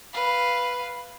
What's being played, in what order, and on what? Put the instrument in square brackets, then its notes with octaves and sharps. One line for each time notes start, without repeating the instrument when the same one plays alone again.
[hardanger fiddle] B4 F5